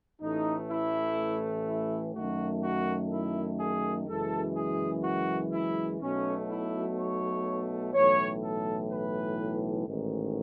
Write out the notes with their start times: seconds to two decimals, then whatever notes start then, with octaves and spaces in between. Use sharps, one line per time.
0.20 A1 A2 E3 A3 D#4
0.69 E4
1.66 E4
2.14 F#2 D#3 A3 F#4
2.62 F#4
3.11 E4
3.58 G#4
4.08 F#1 F#2 E3 G#3 A4
4.55 G#4
5.03 F#4
5.52 E4
6.01 B1 B2 F#3 A3 C#4
6.49 E4
6.97 C#5
7.94 B1 A2 E3 C#5
8.42 A4
8.90 B4
9.87 A1 G#2 D#3